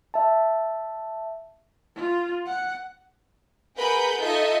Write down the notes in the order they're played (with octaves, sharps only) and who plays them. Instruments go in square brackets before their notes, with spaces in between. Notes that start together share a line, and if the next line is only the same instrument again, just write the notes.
[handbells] E5 A5
[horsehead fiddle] F4
F#5
[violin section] G#4 A#4 B4 F#5 B5 G6
D#4 F4 A4 D#5 E5